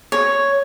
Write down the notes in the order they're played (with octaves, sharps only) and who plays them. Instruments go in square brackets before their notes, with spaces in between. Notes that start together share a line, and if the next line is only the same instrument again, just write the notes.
[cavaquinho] C#5